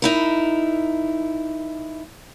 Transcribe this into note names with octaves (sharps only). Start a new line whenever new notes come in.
D#4 E4 A#4